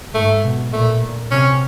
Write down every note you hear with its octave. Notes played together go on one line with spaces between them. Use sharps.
G#2 A3
B2
A#2 A3
A#2
C3 C#4